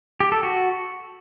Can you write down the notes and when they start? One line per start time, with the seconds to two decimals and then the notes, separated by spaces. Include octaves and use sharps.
0.20 G4
0.32 A4
0.43 F#4